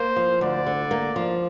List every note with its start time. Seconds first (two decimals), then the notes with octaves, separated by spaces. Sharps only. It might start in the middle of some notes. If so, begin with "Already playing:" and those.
Already playing: A#3 C5
0.16 F3
0.41 D2 D5
0.67 D3
0.91 A#3
1.16 F3